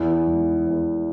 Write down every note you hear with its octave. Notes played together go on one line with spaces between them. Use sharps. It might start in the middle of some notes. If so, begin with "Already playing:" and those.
Already playing: E2 E4
E1
E2